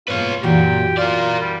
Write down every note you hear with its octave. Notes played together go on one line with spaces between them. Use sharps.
G#2 B2 A#3 F4 B4 C#5
F#2 A#2 E3 F#4 G4
F4 A#4 D5
G3